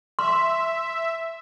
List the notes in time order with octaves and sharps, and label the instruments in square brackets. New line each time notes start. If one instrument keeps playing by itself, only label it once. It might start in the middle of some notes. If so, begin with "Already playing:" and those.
[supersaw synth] E5 [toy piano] C6